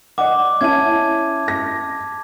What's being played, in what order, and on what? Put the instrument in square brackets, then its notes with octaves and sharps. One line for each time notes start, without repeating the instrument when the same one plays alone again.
[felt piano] D5 D#5 F#5 [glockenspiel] D6
[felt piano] C#4 E4 [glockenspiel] A5 G#6
[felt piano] A#6